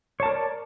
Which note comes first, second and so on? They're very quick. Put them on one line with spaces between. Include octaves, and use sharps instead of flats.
C#5 A5 A#4 D5